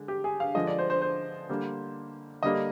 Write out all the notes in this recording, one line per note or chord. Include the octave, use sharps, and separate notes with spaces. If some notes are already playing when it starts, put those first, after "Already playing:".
Already playing: D3 G#3
G4
G#4
F5
D3 F3 G#3 D#5
D5
C5
C5
C5
D3 G3 A#3
D3 G3 A#3 D#5